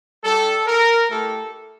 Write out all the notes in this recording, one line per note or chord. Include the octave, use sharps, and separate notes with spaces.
G3 D4 G4 A4
A#4
A3 E4 G4 A4